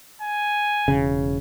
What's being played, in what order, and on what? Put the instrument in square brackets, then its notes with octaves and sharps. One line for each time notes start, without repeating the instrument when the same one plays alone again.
[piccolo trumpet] G#5
[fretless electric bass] E1 C#3